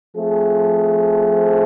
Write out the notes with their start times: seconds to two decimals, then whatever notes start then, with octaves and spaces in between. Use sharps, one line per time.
0.16 F3 A3 C4 G#4